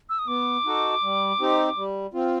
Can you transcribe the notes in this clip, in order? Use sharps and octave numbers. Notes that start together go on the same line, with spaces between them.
E6
D#6
B3 D6
D#4 F#4 A4
G3
C4 D#4 G4
G3
C4 F4